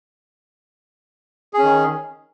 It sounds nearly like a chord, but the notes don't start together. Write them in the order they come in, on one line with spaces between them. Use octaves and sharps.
G#4 C#4 D#3